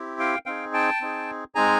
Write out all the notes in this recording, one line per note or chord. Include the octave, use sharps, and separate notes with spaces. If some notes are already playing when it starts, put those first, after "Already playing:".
Already playing: C4 E4 G4
F5 G5
C4 D#4 G#4 F5 G5
G5 A5
C4 D#4 G#4
G#3 C4 D#4 G#4 G#5 A#5